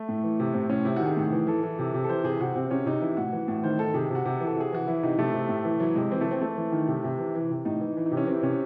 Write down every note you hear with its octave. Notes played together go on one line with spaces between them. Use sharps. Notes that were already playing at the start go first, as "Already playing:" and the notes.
Already playing: A3
A2
E3
C3
A2 C4
A2 C#4
C3 E4
D#3 F#4
G#4
A2
E3
E3 A4
E3
C3
C3
A4
E3 C5
C3 G#4
C3 F#4
C3 C4
C4
C3 C#4
C3 D#4
E3 E4
A2 F#4
E3
A2
D#3 C5
D#3 A4
C3 G#4
C3 F#4
C3
E3
A4
C3 G#4
E3 F#4
E3 E4
C3 D#4
C3 A3
C3
A2
E3
E3 F#3
C3 G#3
E3 C4
A3
E3 C4
E3 A3
E3
D#3
C3
C3
E3
E3
C3
A2 D#4
E3
E3
D#4
C3
C#4
E3 C4
C3 C#4